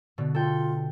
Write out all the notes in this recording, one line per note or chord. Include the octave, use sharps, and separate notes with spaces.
B2 D3
F4 A4 G5